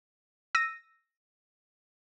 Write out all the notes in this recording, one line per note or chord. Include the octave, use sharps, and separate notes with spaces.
E6 A#6 D#7